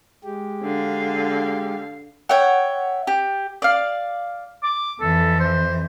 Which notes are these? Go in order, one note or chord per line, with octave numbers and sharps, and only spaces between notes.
G#3 G4
D3 F5
C#5 E5 F#5 G5
G4
D5 F5
D6
F2 E3 A4
C5